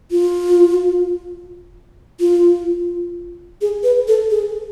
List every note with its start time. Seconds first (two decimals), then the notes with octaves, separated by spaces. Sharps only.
0.11 F4
2.20 F4
3.61 G#4
3.84 B4
4.08 A4
4.31 G#4